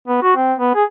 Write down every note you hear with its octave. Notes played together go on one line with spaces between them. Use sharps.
B3
F#4
C4
B3
G#4